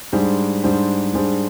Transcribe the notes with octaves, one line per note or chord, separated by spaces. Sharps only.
G#2 G3 D4 G#4 C5
G#2 G3 D4 G#4 C5
G#2 G3 D4 G#4 C5